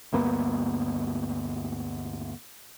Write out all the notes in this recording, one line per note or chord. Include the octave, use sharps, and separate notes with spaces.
D2 G2 A#3 B3